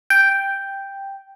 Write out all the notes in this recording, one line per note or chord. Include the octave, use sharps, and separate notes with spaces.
G5